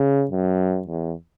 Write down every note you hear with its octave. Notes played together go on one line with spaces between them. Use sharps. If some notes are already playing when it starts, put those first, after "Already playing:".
Already playing: C#3
F#2
E2